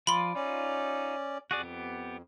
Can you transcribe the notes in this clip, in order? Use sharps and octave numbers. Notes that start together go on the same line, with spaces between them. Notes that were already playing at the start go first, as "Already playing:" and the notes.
F3 F4 D5 B5 C6
C#4 D#4 F4 D5
F2 F#4 G#4 D5
B3 G4